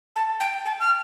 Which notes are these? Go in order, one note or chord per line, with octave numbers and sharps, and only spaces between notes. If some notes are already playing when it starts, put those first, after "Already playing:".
A5
G5
A5
F6